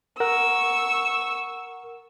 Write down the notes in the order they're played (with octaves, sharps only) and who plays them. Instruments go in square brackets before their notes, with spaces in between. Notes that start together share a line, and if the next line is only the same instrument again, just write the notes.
[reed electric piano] A#4 F#5 [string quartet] C#6 E6